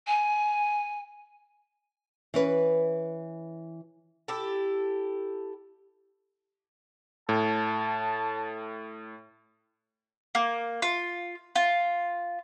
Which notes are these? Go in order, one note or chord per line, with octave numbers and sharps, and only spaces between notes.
G#5
E3 C#4 B4
E4 G4 A4
A2 A5
A#3
F4
F4